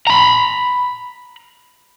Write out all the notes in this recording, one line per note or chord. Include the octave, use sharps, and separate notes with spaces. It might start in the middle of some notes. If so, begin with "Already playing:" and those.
A#5 B5